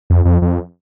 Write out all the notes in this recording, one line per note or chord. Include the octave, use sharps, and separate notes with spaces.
F2
F2
F2